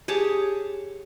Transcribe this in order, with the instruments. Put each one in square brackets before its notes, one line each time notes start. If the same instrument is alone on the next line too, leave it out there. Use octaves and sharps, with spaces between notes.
[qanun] G4 G#4 C#5 A5